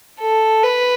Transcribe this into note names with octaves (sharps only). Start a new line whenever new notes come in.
A4
B4